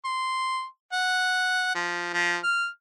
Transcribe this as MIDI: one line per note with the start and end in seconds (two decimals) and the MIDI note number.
0.05 0.64 84
0.93 1.73 78
1.75 2.09 53
2.14 2.37 53
2.43 2.67 89